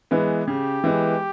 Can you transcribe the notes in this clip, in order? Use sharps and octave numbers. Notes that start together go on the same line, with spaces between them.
E3 G#3 B3
C#3 G4
E3 G#3 B3